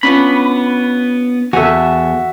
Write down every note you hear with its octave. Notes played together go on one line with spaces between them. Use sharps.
B3 C#4 D4 F4 B5
E2 F#4 A4 E5 G#5